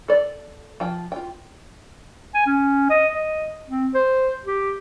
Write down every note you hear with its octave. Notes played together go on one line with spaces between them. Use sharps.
A4 D5
F3 G5
F4 G5
G#5
C#4
D#5
D#5
C4
C5
G4